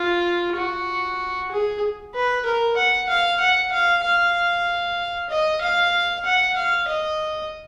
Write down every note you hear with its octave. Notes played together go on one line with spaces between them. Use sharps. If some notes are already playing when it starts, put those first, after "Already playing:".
Already playing: F4
F#4
G#4
B4
A#4
F#5
F5
F#5
F5
F5
D#5
F5
F#5
F5
D#5